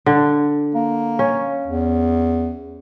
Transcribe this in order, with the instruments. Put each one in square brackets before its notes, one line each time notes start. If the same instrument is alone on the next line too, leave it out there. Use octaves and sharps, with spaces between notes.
[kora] D3
[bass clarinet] A#3
[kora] C#4
[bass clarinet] E2